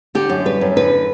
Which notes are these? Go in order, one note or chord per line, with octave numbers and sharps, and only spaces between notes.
D3 G4
F#2
G3 B4
F#2
D3 B4